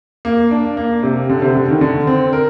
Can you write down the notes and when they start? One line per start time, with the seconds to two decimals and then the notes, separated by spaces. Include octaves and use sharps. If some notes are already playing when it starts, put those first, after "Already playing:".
0.25 A#3
0.51 D4
0.77 A#3
1.03 C3
1.30 D3
1.42 C3
1.55 D3
1.68 D#3
1.81 D3
2.07 C4
2.33 A#4